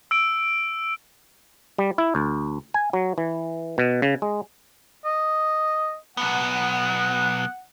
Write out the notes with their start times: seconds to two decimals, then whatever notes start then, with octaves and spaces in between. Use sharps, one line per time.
0.11 E6 D7
1.79 G3
1.98 E4
2.15 D2
2.74 G#5
2.93 F#3
3.18 E3
3.78 B2
4.02 C#3
4.22 G#3
5.05 D#5
6.17 B1 B3 F#5